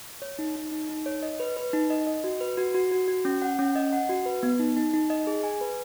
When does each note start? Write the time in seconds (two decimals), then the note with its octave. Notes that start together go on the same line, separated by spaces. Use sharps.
0.22 C#5
0.39 D#4
0.56 D#4
0.72 D#4
0.89 D#4
1.06 C#5
1.23 D#5
1.40 B4
1.57 B4
1.73 D#4
1.90 D#5
2.07 D#5
2.24 F#4
2.41 B4
2.57 F#4
2.74 F#4
2.91 F#4
3.08 F#4
3.25 C#4
3.42 F#5
3.59 C#4
3.76 D#5
3.93 F#5
4.09 F#4
4.26 B4
4.43 B3
4.60 D#4
4.77 D#4
4.94 D#4
5.10 D#5
5.27 G#4
5.44 G#5
5.61 B4